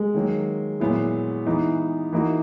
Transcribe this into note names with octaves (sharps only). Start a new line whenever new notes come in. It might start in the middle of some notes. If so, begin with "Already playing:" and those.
Already playing: G#3
D#3 F#3 A#3
A#2 F#3 B3 E4
E3 B3 D#4
E3 A#3 D#4 F#4